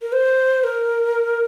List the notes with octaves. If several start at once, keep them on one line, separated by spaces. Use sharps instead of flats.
A#4
C5
A#4